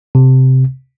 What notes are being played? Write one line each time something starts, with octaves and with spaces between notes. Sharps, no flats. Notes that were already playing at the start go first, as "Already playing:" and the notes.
C3